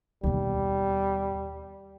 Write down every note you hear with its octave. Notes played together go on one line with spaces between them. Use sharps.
D#2 B2 G3